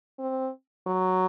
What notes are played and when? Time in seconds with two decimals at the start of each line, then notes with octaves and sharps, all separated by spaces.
0.19 C4
0.87 F#3